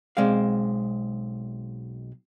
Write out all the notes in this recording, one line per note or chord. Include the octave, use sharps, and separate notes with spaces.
B1 G#3 C4 D5 F5